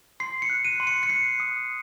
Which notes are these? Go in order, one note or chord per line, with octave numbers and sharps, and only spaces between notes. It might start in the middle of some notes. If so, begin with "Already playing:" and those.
C6 C7
C#7
F#6
D#7
C6
C#7
C#7
F#6 C7
D#6